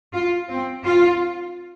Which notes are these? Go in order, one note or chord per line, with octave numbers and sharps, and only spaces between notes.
F4
C4
F4